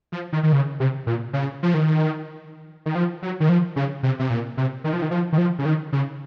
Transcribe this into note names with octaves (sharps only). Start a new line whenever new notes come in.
F3
D#3
D#3
C#3
C3
A#2
C#3
F3
D#3
D#3
F3
F#3
D#3
F3
C#3
C3
C3
A#2
C3
D#3
F3
D#3
F3
D#3
F3
C#3
D#3
C#3